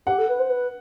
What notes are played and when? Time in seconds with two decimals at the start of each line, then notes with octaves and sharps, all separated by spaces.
0.07 G4 F#5
0.18 A4
0.28 B4
0.39 C5
0.49 B4